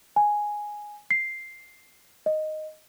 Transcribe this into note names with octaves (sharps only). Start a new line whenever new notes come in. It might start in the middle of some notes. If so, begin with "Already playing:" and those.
G#5
C7
D#5